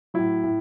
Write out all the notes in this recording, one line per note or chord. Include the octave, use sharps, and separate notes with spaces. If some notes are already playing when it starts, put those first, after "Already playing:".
A2 F#3 E4
A2